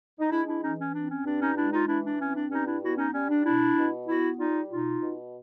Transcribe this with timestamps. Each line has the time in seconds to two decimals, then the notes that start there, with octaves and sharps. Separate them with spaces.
0.20 D#4
0.30 G#3 D4 E4
0.46 D4 E4
0.62 E3 C#4 D#4
0.78 C#4
0.93 C4 D4
1.09 C#4
1.25 G2 D4
1.41 C#4 D#4
1.56 G#3 D4 E4
1.73 D#4 F4
1.87 E3 D4 E4
2.04 D4
2.20 C4 C#4
2.35 D4
2.50 G2 C#4 D#4
2.66 D4 E4
2.82 B3 E4 F#4
2.97 C#4 D#4
3.13 G3 C#4
3.29 D4
3.44 B2 D4 E4
3.77 B2
4.08 B3 E4 F#4
4.38 G3 D#4 F4
4.70 B2 D#4 F4
5.01 B2